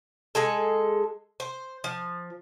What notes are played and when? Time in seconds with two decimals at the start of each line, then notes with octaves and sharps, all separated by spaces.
0.35 G#3 G#4 A4
1.40 C5
1.84 F3